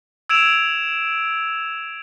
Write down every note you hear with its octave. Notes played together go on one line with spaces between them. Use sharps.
E6 G#6 D7 E7 F7